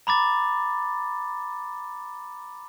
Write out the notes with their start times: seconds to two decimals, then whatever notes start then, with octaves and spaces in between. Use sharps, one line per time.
0.07 A#5 B5 D6 A6